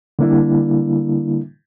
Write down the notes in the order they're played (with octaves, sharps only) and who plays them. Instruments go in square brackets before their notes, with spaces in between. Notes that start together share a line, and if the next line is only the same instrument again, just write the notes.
[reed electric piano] D3 G3 A#3 D4 E4